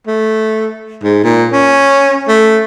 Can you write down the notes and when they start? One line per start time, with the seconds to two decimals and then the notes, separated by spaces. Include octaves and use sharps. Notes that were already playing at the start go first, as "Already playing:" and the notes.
0.07 A3
1.04 G#2
1.24 A#2
1.52 C#4
2.28 A3